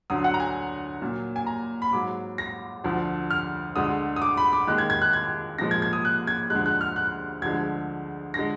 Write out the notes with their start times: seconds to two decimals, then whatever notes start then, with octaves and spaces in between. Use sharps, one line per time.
0.10 D2 D3 F#3 D#6
0.24 F#5
0.34 A#5
0.40 G#5
1.01 A#2 F#3
1.36 G#5
1.46 A#5
1.82 B5
1.93 G#2 F#3 D6
2.38 A#6
2.84 D2 D3 F3
3.31 F6
3.76 D2 D3 G#3 D#6
4.16 D#6
4.22 D6
4.37 B5
4.53 D6
4.67 D#2 D#3 G#3 F#6
4.78 G#6
4.90 G#6
5.02 F#6
5.13 G#6
5.59 A#2 F3 G#3 A#6
5.71 G#6
5.82 G#6
5.93 D#6
6.05 F#6
6.27 G#6
6.50 D2 D3 F3 G#3 F#6
6.66 F#6
6.81 F6
6.96 F#6
7.42 D2 D3 F3 G#3 G#6
8.34 D3 G#3 A#6